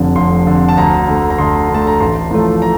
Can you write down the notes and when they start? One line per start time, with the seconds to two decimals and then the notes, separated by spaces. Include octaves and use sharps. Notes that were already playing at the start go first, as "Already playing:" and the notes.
Already playing: F1 F2 D3
0.16 F1 C6
0.46 F2 D3
0.69 A5
0.77 D2 A#5
1.08 D3 A3
1.30 A#5
1.38 D2 C6
1.69 D3
1.74 A3 A5
1.87 A#5
2.00 A1 C6
2.31 A2 F3 A3
2.62 A#5